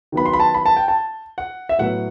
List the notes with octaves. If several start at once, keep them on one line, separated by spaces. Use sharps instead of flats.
D#3 F#3 B3 B5
C6
B5
A5
B5
A5
G5
A5
F#5
E5
A2 F#3 B3 F#5